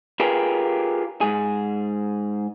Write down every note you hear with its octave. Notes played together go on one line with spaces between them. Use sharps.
F4 G4 G#4 A#4 B4
G#2 G#4